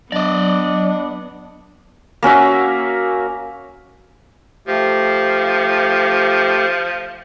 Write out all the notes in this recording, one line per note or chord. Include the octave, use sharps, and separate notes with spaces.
F#3 B3 D4 D5 D#5
A#3 C#4 F#4 E5
F3 A3 G4